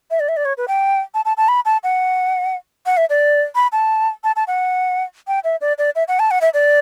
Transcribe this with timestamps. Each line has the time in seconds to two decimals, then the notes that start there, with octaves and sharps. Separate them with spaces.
0.11 E5
0.20 D5
0.29 E5
0.37 D5
0.45 C#5
0.57 B4
0.68 G5
1.14 A5
1.25 A5
1.37 A5
1.48 B5
1.65 A5
1.83 F#5
2.86 F#5
2.97 E5
3.10 D5
3.55 B5
3.72 A5
4.24 A5
4.36 A5
4.47 F#5
5.27 G5
5.44 E5
5.61 D5
5.78 D5
5.95 E5
6.08 F#5
6.19 A5
6.31 F#5
6.41 E5
6.54 D5